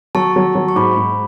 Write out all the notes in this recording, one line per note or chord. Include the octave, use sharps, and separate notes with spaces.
F#3 A5 C#6
F#3
F#3
C#6
G#2 B5 D6
G#2